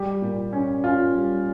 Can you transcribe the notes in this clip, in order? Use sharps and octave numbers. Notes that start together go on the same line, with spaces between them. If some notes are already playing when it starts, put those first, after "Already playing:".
Already playing: G3 G4
A#2
C#4
C#4 F4
G3